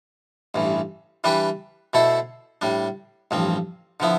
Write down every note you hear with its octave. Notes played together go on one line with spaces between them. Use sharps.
A1 G2 E3
E3 G3 D4 G4 B4
B2 A3 E4 A4 C5
A2 G3 D4
A1 G2 F3 C4
D3 F3 B3 E4